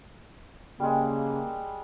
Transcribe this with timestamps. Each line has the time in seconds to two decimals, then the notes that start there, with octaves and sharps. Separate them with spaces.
0.80 C#3 G3 G#3 A#3